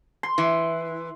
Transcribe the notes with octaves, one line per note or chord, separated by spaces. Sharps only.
C6
E3